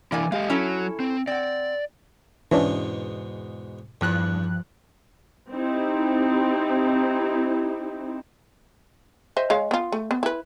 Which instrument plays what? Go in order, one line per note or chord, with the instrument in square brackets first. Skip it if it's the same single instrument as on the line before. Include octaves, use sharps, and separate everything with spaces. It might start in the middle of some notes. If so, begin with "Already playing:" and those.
[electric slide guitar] E3 D4 E4 [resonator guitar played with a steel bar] A#3 D5 G#5
[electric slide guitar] G#3 G4 D#5 [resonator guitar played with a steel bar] F5
[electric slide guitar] F#3 [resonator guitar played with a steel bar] C#4 E4 A4
[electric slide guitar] C4
[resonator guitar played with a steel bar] C4 F#5 [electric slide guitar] D5
[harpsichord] E2 G#2 B2 [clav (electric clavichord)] E3 C#4 D4
[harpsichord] E2 [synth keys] G2 F3 F#6
[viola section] C4 D#4 E4 G4
[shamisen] C5 D#5 E5
G#3 C#5 F5
B3 F4
A3
B3
E4 B4